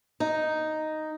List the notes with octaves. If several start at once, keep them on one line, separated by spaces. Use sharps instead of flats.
D#4